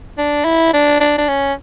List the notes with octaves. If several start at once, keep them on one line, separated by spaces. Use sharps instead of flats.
D4
E4
D4
D4
D4
C#4